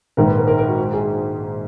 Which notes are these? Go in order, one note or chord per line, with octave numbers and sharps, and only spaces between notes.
A#1 G#2 D#3 A#4
B4
A#4
A#4
A#4
F#4
F#4
G#4